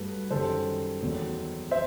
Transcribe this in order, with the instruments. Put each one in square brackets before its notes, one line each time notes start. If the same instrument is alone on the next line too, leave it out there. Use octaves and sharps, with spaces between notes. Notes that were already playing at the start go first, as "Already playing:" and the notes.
Already playing: [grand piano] G2 F#3 A3 B4
F#2 D#3 G3 A4 C5
E2 D#3 F#3 A3
C5 E5